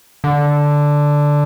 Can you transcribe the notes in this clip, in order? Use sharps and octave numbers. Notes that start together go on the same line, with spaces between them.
D3